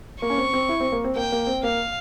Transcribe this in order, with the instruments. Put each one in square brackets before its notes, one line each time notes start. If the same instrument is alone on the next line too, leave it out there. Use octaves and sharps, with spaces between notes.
[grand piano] A#3 [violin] C#6
[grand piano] C#4
C4
C4
E4
C4
A#3
C4
[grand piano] A#3 [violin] G5
[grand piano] A#3
C4
[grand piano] A#3 [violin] F5